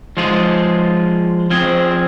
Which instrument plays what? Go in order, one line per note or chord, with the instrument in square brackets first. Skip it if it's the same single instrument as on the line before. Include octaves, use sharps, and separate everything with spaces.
[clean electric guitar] F3 G#3 F4 G#4
F3 C4 G#4